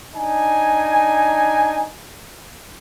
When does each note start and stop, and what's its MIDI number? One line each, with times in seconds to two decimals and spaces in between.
0.14 1.86 62
0.14 1.86 63
0.14 1.86 80